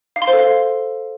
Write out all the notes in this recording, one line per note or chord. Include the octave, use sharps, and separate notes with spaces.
F5
C6
C5
A4
F5